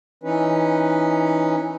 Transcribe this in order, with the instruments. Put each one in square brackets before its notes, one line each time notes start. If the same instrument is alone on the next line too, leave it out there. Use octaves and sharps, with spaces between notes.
[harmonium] E3 C#4 D#4 B4